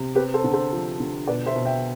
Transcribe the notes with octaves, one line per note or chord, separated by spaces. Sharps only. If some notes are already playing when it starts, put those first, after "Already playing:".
Already playing: C3
C4 G4 B4
A4 C5
D3
A4 C5
F3
D3
B2 B4 D5
C5 E5
B2
E5 G5